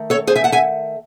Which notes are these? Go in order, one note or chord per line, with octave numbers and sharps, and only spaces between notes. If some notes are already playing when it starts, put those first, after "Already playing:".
Already playing: D#3 A3
A4 C#5
G#4 C5
E5 G#5
F#5 A5
E5 G#5